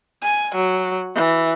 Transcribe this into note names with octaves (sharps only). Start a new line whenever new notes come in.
G#5
F#3
E3